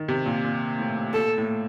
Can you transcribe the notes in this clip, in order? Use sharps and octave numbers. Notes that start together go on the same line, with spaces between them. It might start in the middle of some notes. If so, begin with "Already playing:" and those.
Already playing: D#3
C3
A#2
A#2
A2
A#2 A4
A2